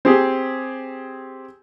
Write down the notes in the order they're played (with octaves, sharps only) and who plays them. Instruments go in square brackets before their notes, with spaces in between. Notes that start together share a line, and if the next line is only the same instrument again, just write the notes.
[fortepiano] C4 G4 G#4